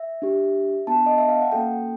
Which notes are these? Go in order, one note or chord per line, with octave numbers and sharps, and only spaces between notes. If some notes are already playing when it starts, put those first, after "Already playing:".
Already playing: E5
D4 G4
B3 D4 F#4 A5
D#5
E5
F5
F#5
A#3 C#4 F#4 A4 G5